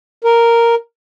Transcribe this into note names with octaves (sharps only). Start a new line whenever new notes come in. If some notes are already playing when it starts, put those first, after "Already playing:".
A#4